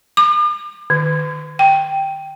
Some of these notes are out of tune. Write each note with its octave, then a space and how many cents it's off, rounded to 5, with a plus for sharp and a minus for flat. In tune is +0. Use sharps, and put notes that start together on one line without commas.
D6 +45
D#3 -20
G5 +0